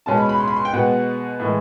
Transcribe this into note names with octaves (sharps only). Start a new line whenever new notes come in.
B2 G#3 C#4 A5
B5
B5
C6
B5
C6
G5
B2 G#3 B3 F#5
A2 E3 G#3